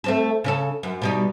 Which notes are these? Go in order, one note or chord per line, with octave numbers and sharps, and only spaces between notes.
A3 C4 A4
C#3 C#4 A4
F#2
B2 G3 D#4